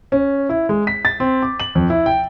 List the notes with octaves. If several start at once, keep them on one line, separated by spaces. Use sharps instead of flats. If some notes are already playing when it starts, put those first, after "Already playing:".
C#4
E4
G#3
B6
A6
C4
D6
F#7
F2
E4
G5